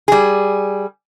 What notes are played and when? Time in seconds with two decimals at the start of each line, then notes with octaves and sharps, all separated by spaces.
0.08 G3 G#4